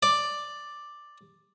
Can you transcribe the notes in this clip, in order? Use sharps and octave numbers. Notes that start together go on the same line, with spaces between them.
D5